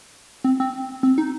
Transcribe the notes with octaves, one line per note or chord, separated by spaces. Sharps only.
C4
C4
C4
D#4